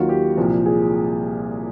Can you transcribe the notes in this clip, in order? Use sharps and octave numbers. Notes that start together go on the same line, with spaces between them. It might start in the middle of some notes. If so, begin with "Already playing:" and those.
Already playing: D#2 D#3 F#3 F4 F#4
G4
C2 A#2 F3
G#4